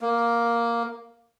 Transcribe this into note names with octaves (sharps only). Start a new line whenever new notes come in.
A#3